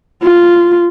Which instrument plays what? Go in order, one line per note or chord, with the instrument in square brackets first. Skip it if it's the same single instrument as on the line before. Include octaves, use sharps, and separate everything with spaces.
[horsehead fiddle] F4